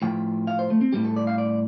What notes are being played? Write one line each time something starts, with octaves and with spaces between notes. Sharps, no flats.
A2 F3 G5
F5
C5
A3
C4
A2 G3 G4
A4
D5
F5
D5